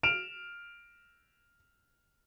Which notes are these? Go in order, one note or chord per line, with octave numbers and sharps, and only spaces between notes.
F6 D7 E7 F7